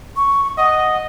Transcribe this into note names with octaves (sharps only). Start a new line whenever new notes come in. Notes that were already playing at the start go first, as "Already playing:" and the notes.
C#6
D#5 F#5